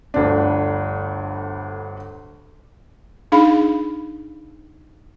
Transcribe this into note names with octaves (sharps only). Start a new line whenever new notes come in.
G1 D2 D4
D4 D#4 G#4 F5 B5